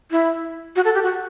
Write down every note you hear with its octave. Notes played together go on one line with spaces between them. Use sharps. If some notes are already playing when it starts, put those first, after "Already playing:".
E4
F#4
A4
G4
F#4